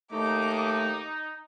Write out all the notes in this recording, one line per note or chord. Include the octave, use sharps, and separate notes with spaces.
D#2 A3 D#4 D6